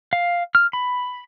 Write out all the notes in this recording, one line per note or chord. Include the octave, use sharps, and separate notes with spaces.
F5
F6
B5